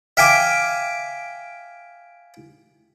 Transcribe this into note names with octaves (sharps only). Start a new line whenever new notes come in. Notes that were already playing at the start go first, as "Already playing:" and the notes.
E5 F5 G5 G#5 D6